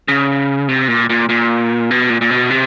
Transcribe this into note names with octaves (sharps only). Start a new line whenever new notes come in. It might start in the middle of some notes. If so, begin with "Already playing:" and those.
C#3
C3
A#2
A#2
A#2
B2
A#2
A#2
B2
C3